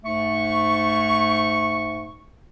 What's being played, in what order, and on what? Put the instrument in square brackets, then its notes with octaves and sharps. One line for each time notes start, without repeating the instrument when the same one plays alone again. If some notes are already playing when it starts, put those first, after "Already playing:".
[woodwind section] G#2 A3 C#6